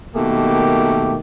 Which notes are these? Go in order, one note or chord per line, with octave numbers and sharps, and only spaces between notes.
B2 D#3 A3 A#3 G4